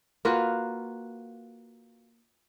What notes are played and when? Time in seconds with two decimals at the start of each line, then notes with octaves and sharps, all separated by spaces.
0.25 A#3 F4 F#4 B4